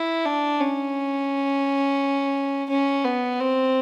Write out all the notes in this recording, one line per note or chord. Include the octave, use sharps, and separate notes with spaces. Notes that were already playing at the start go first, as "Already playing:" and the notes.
Already playing: E4
D4
C#4
C#4
B3
C4